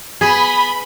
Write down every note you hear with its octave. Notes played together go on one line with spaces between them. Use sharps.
B3 G#4 B5